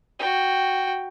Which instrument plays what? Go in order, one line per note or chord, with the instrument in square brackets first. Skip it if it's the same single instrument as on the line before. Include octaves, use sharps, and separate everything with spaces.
[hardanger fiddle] F#4 G5